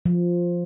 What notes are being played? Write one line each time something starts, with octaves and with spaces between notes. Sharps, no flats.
F3